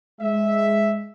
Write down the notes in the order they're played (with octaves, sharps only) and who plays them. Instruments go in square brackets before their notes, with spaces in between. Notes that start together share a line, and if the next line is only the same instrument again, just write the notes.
[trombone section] G#3 [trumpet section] E5